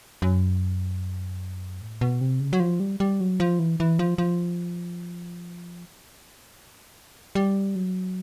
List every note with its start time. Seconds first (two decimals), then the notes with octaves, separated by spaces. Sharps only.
0.22 F#2
1.81 A2
2.01 B2
2.21 C3
2.40 C#3
2.53 F#3
2.60 F3
2.80 G3
3.00 G3
3.20 F#3
3.40 F3
3.59 E3
3.80 E3
3.99 F3
4.18 F3
7.35 G3
7.76 F#3